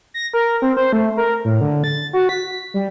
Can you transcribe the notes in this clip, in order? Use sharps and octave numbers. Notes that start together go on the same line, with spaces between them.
A#6
A#4
C4
C5
A3
A#4
A2
D3
A6
F#4
B6
G3